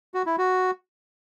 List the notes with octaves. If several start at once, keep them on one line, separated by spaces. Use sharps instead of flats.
F#4
E4
F#4